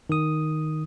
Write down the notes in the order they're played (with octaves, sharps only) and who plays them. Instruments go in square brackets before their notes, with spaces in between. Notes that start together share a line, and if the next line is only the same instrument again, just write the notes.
[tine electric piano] D#3 D#6